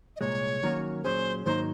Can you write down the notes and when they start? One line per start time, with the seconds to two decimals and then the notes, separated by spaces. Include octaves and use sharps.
0.16 D#5
0.20 C2 A#2 G#3 C#5
0.63 D#3 F#3 A#3 C#4 F#4
1.04 A#2 F#3 C#4 G#4 C5
1.45 G#2 D#3 F#3 A#3 D#4 C5